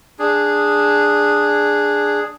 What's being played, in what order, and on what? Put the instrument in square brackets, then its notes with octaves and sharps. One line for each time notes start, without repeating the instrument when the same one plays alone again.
[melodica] D4 G#4